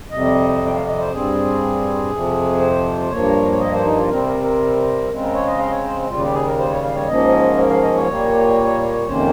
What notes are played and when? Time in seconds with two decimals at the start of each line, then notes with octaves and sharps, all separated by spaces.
0.12 F2 C3 G3 D#5
0.66 G5
0.74 F5
0.86 D#5
0.99 C5
1.11 G2 G3 C4 G#4
2.11 F2 C3 F3
2.61 C5
3.10 G2 F3 A#3 C#5
3.52 C#5
3.60 D#5
3.72 C5
3.85 D#4
3.97 F4
4.09 C3 G3 C4 A#4
4.26 A#4
4.42 A#4
5.09 C#3 G#3 C4
5.22 A#4
5.34 C#5
5.46 D#5
5.59 F5
5.66 D#5
5.71 C#5
5.84 C5
6.08 D#2 C#3 G3 F4
6.21 G4
6.33 G#4
6.46 A#4
6.59 C5
6.70 C#5
6.83 F5
6.95 C#5
7.08 G#2 F3 A#3 C#4 D#5
7.58 A#4
7.70 F5
7.83 D#5
7.95 C#5
8.07 A#2 G3 A#3
9.07 F2 C3 D#3 A#3 C#4 C5